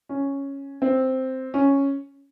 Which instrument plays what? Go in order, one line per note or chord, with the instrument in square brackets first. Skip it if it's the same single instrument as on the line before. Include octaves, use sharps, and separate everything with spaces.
[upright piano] C#4
C4
C#4